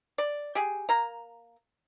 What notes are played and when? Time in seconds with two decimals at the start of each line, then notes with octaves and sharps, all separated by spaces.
0.18 D5
0.55 G4 G#4
0.89 A#3 A#5